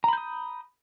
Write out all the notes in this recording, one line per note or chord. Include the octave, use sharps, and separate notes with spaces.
A#5 B5 D#6 G6